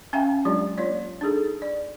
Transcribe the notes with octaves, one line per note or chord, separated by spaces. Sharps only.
C#4 E5 F5 G5 G#5 A#5
F#3 G#3 D4 F4 G4 D5
A#3 F4 C#5 D5
D4 D#4 G#4 A4
D5